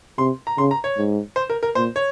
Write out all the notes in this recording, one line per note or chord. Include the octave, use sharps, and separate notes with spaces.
C3 C6
A#5
C#3 C6
A#5
C#5
G#2
C5
A#4
A#4
A#2 C5
C#5